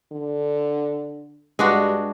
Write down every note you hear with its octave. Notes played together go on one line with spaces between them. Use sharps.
D3
G2 G#3 D4 F#4